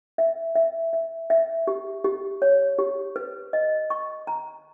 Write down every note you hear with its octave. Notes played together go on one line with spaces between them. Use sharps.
E5
E5
E5
E5
G4
G4
C#5
G4
B4
D#5
C#6
A#5